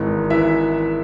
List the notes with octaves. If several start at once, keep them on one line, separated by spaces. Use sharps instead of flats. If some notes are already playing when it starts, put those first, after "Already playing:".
Already playing: G#1 G#2 E3
E3 E5